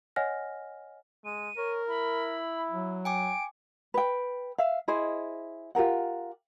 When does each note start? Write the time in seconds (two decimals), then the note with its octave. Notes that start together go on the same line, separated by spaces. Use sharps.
0.16 C#5 D#5 F#5 G#5 F6 A#6
1.25 G#3 D#7
1.57 A#4 C#5
1.88 E4 B5
2.71 F#3
3.05 G5 G#5 D6 D7
3.94 B4 G5
4.58 E5 F5
4.88 E4 G#4 C5 D#5
5.75 F4 G4 A#4 F#5